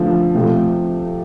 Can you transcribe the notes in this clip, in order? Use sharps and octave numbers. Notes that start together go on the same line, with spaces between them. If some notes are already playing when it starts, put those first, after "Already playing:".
Already playing: D3 F3 A3 A4
C3 F3 A3